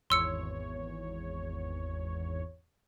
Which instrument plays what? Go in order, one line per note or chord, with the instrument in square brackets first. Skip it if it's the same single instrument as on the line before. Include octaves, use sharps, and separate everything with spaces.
[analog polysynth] G#1 E2 C#5 [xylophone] C6 E6 C#7